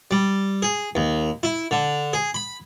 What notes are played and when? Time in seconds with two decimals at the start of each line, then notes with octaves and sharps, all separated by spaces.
0.11 G3
0.62 G#4
0.95 D#2
1.43 E4
1.71 D3
2.13 G#4
2.34 B5